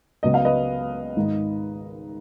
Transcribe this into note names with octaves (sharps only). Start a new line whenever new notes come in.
C#2 C#3 F#3 B3 D#5
F5
B4 D#5
G#1 G#2 D#3